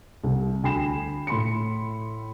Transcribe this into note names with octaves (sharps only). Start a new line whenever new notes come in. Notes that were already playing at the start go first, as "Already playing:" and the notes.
C2
D2 G5 G#5 B5 C7 E7
A2 B5 C6 C#7